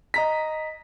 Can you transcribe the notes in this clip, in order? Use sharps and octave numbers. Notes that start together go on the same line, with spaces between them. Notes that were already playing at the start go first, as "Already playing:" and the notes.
D#5 A#5 B6